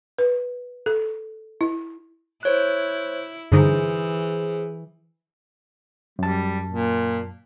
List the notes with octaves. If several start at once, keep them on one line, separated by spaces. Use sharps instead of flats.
B4
A4
E4
E4 C5 C#5 F#6
G2 D3 E3 D#4 G#4 C5
F#2 G3 A5
A#2